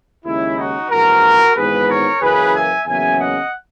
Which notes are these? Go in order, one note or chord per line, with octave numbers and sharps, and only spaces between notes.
D#2 C#3 G#3 C#4 E4
D#4 F#4
A#1 G#2 E3 F#4 A#4
G#1 G#2 E3 B3 G#4 B4
A#4 C#5
F#1 F#2 E3 A#3 C#4 G#4 B4
E5 G#5
E2 C#3 F#3 A#3 C#4 E5 G#5
D#5 F#5